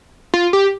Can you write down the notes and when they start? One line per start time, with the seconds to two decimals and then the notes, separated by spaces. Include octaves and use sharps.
0.34 F4
0.53 G4